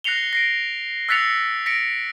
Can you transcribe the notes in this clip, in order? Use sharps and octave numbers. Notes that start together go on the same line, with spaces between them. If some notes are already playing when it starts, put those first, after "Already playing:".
F#6 A#6 C7 C#7 F7 G7
A#6 C7 D7
E6 F#6 A6 B6 C#7 F7
A#6 B6 C#7 D7